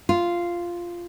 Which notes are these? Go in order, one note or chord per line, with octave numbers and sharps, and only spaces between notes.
F4